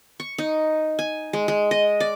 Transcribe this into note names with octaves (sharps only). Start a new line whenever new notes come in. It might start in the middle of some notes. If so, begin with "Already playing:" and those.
C#6
D#4
G#5
G#3
G#3
D#5
D5